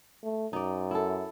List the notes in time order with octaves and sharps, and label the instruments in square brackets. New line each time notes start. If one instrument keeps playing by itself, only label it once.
[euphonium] A3
[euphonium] F#2 [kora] D#4 D5
[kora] E4 A4